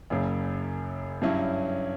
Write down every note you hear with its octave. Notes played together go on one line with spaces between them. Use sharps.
F#1 F#2 C#3
G2 F#3 C#4 E4